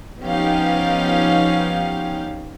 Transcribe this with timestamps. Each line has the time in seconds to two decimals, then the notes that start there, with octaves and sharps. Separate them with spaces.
0.22 F3 B3 C#4 D#4 G4 F5